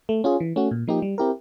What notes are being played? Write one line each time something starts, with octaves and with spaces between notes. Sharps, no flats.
A3
C#4 F4 G#4
E3
A3 C#4 F#4
A#2
F3 A#3 D#4 G4
G3
C4 E4 G4 A#4